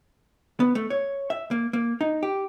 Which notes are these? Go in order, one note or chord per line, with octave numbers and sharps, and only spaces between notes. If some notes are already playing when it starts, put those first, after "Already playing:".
B3
A3
C#5
E5
A#3
A#3
D#4
G4